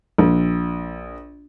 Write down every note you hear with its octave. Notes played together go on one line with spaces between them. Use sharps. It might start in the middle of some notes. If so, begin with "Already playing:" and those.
A#1